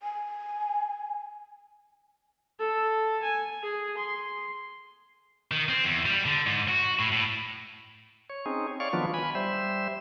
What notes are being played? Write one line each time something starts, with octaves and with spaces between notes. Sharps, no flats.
G#5
A4
G#5
G#4
C6
D#3
C4
E2
G3
D3
G#2
F#4
A2
A2
C#5
C4 C#4 D#4 G#4
C#5 D5 F5 C#6
D#3 F3 F#3 B3 D4 F4
G#5 B5
G3 C5 E5